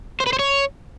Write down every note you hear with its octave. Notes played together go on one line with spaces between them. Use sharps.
C5
B4
C5
C#5